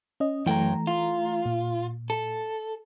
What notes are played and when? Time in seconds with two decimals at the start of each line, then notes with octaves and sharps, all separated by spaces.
0.20 C#4 D#5
0.46 F#2 E3 A3 G5 A#5
0.87 F4
1.46 A#2
2.10 A4